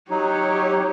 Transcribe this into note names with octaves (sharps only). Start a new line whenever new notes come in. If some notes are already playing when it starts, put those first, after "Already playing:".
F#3 D#4 G4 C#5